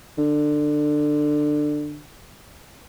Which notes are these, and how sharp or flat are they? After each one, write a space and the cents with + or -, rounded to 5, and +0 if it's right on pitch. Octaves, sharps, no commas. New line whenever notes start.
D3 +20